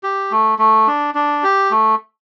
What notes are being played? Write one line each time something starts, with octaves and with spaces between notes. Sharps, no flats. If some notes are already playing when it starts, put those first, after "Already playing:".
G4
A3
A3
D4
D4
G4
A3